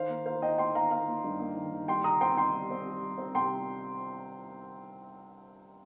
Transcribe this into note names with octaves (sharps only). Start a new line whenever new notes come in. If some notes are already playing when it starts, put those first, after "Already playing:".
Already playing: D#3 C5 F5
A#3
A#3 C5 F5
D#4 D#5 G5
D#4 G5 C6
D#3 F5 A#5
A#3 F5 A#5
A#3
G2
A#3
D#3
D#3
G3 G5 C6
C3 A#5 D#6
C4 G5 C6
D#4 G5 C6
G3
C4
G3
G3
C4
C3 G5 C6
G3